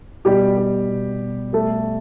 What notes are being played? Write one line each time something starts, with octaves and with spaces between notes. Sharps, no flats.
B2 G3 G4
G3
B2
B2
G3 A3 A4